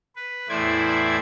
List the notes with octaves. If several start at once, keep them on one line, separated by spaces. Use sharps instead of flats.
B4
E2 A2 E4 C5 D5 G#6